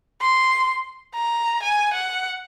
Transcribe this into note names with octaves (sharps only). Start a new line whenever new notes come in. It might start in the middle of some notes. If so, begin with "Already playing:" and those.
C6
A#5
G#5
F#5